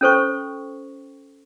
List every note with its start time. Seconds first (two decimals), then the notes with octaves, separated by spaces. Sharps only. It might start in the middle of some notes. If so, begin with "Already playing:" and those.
0.01 C#4 F4 A4 C5 G5 C#6